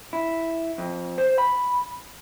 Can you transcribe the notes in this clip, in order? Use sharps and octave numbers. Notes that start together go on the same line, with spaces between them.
E4
F2
C5
B5